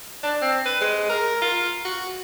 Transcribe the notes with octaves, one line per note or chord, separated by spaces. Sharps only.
D4
C4
B4
G#3
A#4
F4
F#4